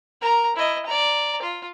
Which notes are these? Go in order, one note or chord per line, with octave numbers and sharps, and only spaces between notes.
A#4 A#5
E4 D#5
D5 A#5
F4